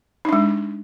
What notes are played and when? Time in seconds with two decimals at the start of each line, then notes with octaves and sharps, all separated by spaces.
0.25 D#4
0.29 D4
0.33 G#3